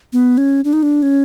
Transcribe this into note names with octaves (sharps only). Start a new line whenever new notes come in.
B3
C#4
D4
D#4
D4
C#4